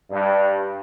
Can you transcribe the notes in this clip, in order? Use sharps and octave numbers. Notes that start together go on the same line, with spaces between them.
G2